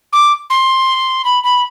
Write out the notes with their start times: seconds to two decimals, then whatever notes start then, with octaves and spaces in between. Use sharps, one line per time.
0.13 D6
0.50 C6
1.25 B5
1.43 B5